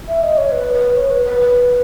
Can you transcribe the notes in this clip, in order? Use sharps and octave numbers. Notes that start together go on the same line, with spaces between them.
E5
D#5
C#5
B4
B4
C#5
B4
B4
B4